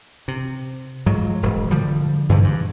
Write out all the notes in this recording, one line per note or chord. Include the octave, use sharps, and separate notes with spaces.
C3
G#2 F3 F#3
E1 G#2
D3 F3 G3
G2 D3 E3 F3
G2